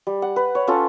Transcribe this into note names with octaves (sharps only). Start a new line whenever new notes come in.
G3
F#5
B4
C#5
C#4 F4 A4